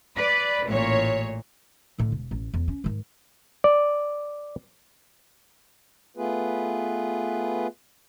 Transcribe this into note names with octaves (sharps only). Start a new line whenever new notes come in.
B4 D5
A1 A#2 C#5
A2 D3
E1
A1
E2
C#4
G#2 D#3
D5
A3 B3 F4 G#4 B4